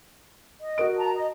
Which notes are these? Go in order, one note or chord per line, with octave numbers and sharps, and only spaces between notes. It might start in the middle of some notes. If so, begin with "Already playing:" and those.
D#5
F#4 A#4 D7
A5 A#5
D#5